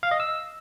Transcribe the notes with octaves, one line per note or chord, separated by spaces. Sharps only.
F5
D#5
E6